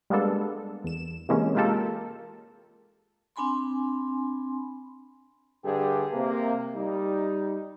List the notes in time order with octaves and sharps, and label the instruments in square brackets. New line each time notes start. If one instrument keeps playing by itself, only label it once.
[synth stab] G3 G#3 A#3 B3 D4 A4
E2 E7
C3 E3 G#3 A#3 C#4
G#3 A#3 F4 G4 A4 A#4
[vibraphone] C4 D4 G#5 B5 C6
[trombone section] G2 D3 G4 G#4
C3 A#3
G3 D#4